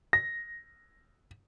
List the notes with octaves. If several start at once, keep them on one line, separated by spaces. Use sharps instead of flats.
A#6